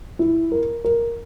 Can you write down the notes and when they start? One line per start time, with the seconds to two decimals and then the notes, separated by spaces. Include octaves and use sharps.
0.19 E4
0.52 A#4
0.85 A#4